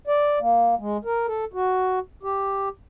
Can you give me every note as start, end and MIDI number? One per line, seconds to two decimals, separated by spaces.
0.07 0.39 74
0.40 0.75 58
0.79 0.97 56
1.05 1.26 70
1.27 1.45 69
1.54 1.99 66
2.23 2.69 67